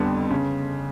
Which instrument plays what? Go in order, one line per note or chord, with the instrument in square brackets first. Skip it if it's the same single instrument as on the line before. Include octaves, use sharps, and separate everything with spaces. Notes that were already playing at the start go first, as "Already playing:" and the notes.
Already playing: [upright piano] F2 D3 G3 B3 C6
C#3